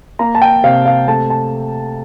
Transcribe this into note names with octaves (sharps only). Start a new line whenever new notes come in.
A#3 A#5
A5
G5
C3 F5
F5
A3 A5
A5